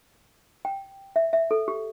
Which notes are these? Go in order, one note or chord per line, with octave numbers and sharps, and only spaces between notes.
G5
E5
E5
A4
G4